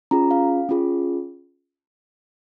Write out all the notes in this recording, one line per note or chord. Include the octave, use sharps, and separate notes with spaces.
C#4 F4 G#4 A#5
F5
C#4 F4 G#4